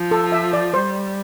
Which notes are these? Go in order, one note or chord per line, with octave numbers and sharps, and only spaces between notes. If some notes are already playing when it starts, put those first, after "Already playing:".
Already playing: F3
A4
E5
D5
G3 C5